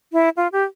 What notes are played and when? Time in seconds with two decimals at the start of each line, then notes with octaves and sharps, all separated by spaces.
0.13 E4
0.37 F4
0.52 G4